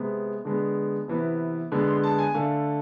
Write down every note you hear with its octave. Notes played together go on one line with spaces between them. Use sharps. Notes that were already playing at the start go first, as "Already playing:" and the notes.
Already playing: C3 G#3 B3
D3 G#3 B3
C3 E3 B3
D3 G#3 B3
C6
A5
G#5
D3 A3 F5